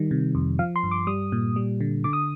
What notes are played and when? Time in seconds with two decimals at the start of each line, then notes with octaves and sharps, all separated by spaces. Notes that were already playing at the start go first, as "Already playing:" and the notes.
Already playing: D#3 G3
0.11 C3
0.35 F2
0.59 F3 F5
0.76 C6
0.83 G2
0.91 D6
1.07 G3 D#6
1.32 A#2
1.56 G3
1.81 D3
2.04 D3 D6
2.13 D#6